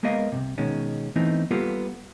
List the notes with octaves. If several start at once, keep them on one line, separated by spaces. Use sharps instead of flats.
G#3 A#3 B3 A#4 D#5 F5
C2 F#2 C3
B2 D#3 G#3 C#4
E3 A3 B3 C4 D#4
G3 A#3 B3 F4 G4 A4